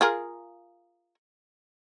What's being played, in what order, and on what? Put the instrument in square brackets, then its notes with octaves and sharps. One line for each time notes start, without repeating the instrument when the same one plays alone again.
[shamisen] F4 G#4 A#4